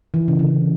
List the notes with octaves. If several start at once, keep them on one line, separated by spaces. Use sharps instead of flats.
E3
C#3
D3